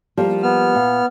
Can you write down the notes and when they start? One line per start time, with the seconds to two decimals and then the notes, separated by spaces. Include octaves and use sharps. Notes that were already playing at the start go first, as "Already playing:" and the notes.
0.17 F3 G3 A#3
0.43 B3 F6
0.75 A#2